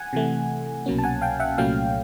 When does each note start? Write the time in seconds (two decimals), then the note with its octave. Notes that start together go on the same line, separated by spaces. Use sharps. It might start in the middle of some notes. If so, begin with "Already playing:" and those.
Already playing: F#5 G#5
0.13 C3 E3 A3
0.86 C2 B2 F#3 A#3 C#4
0.98 A5
1.04 F#5 G#5
1.22 F5 G5
1.40 E5 F#5
1.58 C2 A#2 F#3 A3 C#4 F5 G5